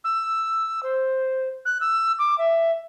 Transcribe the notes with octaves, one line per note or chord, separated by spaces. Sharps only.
E6
C5
F#6
E6
D6
E5